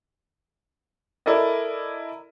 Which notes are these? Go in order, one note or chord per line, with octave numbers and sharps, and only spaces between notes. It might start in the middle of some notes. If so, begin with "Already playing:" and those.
E4 A4 A#4 D5 D#5